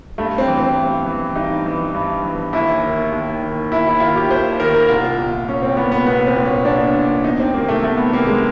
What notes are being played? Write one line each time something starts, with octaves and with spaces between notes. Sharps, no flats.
G2 A3
C4
E3
C4
G2
E3
G2 D#4
E3
G2
E3
D#2 E4
D#3
D#2
D#3
D#2 E4
E4
D#3 F4
G4
D#2 C5
D#3 A#4
A#4
C2 F4
A#2
C2 C#4
C4
A#2 B3
B3
C2 B3
C4
A#2
C#4
C2 D4
A#2
E2 D#4
C4
C3 D#3 A#3
A3
E2 A3
B3
C3 D#3 A#3
G#3